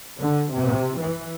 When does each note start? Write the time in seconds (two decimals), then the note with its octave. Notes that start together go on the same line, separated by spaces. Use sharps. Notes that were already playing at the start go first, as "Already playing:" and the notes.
0.20 D3
0.53 C3
0.99 E3